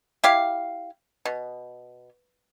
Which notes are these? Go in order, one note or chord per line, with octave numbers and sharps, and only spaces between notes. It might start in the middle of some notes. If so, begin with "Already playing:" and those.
E4 G4 F5
B2